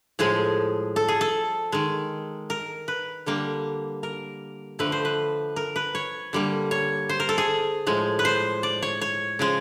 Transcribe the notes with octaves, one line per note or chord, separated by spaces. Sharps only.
A2 F3 G#3 G#4
A4
G#4
A4
D#3 G#3
A#4
B4
D3 G3 A#3
A#4
D3 F3 A3 B4
C5
B4
A#4
B4
C#5
D3 G3 A#3
C#5
C5
A#4
A4
G#4
A2 F3 G#3
B4
C5
D5
C#5
C#5
C#3 F3 G#3